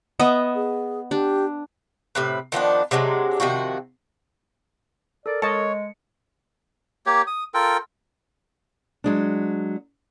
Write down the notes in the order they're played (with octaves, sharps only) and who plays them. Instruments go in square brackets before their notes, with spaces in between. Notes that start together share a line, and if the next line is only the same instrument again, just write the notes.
[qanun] B3 D#5 E5
[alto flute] G#4
[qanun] D4 [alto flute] G4
[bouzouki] A2 C3 B4
D#3 F3 B3 D4
C3 F#3 G#3 D4
C3 D#3 F3 F#4
[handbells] A4 A#4 [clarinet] D5
[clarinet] G#3 [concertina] C#5 [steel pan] D#5 A5 [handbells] C#7
[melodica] A#3 G4 C#5
D#6
F4 A4 A#4 G5
[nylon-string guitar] F#3 G#3 D4